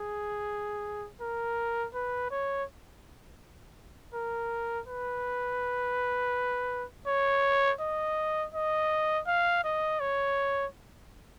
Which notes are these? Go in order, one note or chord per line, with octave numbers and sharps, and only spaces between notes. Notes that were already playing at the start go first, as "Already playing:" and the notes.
Already playing: G#4
A#4
B4
C#5
A#4
B4
C#5
D#5
D#5
F5
D#5
C#5